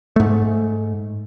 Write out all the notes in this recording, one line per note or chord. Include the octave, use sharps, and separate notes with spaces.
G#2 A3